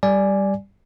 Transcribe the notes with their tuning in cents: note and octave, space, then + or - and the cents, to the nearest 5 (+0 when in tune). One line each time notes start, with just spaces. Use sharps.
G3 +0 D5 +0 G#5 +0